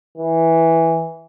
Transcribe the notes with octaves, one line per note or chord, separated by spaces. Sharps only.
E3